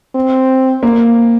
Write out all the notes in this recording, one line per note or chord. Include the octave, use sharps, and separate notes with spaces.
C4
A#3